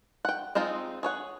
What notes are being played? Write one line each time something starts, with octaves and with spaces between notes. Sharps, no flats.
F#5 G5
G#3 C4 D#4 F4
G#4 C#5 F#5